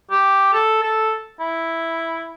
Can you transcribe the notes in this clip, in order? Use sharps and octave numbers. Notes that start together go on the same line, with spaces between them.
G4
A4
A4
E4